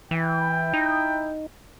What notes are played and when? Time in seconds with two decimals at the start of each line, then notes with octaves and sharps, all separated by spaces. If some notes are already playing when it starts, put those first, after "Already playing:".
0.11 E3 E4 G5
0.73 D#4